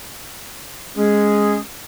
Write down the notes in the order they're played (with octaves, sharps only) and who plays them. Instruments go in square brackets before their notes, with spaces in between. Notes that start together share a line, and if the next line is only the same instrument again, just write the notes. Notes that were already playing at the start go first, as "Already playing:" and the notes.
[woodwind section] G#3 C#4 G#4